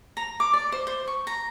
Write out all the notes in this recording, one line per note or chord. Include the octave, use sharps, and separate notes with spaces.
A#5
D6
D5
C5
C5
C#6
A#5